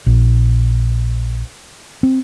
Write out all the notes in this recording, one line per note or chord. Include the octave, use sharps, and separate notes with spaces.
A#1
C4